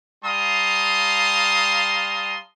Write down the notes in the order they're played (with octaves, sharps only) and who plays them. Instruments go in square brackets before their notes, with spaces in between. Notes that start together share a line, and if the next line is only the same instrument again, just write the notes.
[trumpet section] G3 F5 A5 A#5 C6 D#6